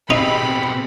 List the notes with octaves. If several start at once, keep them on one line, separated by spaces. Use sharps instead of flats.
B2 C4 D#4 G4 G#4 B5